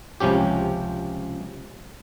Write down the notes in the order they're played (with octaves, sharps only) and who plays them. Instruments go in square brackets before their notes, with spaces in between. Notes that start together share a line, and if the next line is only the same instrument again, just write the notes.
[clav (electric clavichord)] C#2 C3 F3 C#4 G4